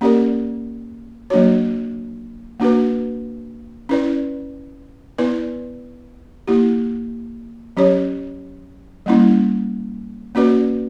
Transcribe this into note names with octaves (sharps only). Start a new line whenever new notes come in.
A#3 C#4 G4 A#4 D5
F#3 A#3 D4 F#4 C#5
A#3 D4 F#4 B4
C#4 E4 B4 D5
B3 E4 B4 D5
A#3 E4 G4
F#3 C#4 G4 C#5
G3 A#3 C#4 E4
A#3 C#4 F#4 B4 D5